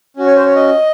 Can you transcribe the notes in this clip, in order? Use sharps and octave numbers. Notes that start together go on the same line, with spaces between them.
C#4 F#4
C#5
C5
C#5
D#5